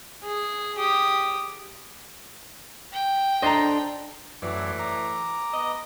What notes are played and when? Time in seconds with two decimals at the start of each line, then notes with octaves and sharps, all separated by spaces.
0.24 G#4
0.78 G4 D#6
2.92 G5
3.42 D4 A4 C5 D#5 A#5
4.42 F#2 A2 E3 D5
4.79 A#5 D6
5.53 B3 D#5